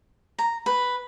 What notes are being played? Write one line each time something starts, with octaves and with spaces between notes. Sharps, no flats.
A#5
B4